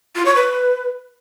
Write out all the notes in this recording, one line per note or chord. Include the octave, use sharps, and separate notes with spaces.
F4
C#5
B4